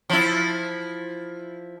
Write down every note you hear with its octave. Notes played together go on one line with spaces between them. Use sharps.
F3 E4